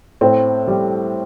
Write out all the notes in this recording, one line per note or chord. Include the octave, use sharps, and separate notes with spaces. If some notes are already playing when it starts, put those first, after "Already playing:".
A2 C4
G3